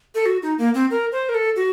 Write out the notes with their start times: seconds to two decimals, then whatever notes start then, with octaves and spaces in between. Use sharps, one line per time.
0.15 A4
0.26 F#4
0.43 D#4
0.58 A#3
0.74 C4
0.91 A#4
1.12 C5
1.29 A#4
1.34 A4
1.56 F#4